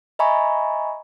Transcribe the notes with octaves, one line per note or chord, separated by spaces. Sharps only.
D#5 E5 G#5 A#5 B5 C#6